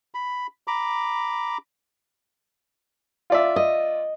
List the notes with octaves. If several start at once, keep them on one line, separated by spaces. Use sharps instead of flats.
B5
A#5 B5 D6
F4 D5 E5
D#5